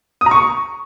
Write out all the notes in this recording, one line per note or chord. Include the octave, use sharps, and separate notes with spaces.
D#6
A#5
C#6